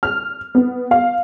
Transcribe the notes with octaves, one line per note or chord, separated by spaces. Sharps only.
F6
B3
F5